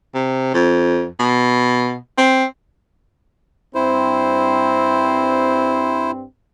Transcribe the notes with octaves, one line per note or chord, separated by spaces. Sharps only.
C3
F2
B2
C4
G2 C4 E4 C5